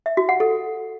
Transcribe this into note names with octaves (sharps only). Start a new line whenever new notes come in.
E5
F#4
F#5
A4